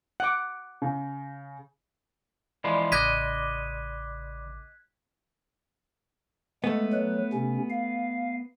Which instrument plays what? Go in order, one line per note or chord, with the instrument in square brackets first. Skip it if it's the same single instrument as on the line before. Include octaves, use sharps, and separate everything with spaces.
[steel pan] F#5 D6
[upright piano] C#3
[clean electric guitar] E3 F3 G#3 [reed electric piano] D5 B5 C6
[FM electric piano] A1 C#3 D6 [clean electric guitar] D#5 [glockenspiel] F#6 G#6 B6
[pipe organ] G#3 [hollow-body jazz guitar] A3 B3
[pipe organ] F#3 B4
C3 C#4
F5